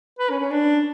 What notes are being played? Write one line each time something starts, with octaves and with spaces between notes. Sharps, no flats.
B4
C#4
C#4
D4